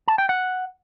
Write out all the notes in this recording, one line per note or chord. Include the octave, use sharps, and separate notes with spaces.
A5
G5
F#5